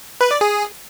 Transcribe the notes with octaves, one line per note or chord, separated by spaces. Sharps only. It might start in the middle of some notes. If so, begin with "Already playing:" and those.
B4
D5
G#4